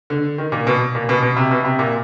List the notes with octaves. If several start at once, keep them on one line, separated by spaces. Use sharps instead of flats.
D3
D#3
A#2
B2
A#2
B2
B2
C3
B2
C3
A#2